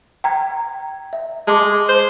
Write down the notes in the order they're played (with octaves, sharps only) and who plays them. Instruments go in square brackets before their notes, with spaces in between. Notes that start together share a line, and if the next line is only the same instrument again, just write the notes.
[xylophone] G5 A#5 G#6
E5
[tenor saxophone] G#3 [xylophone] A5 C6 D6
[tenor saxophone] C5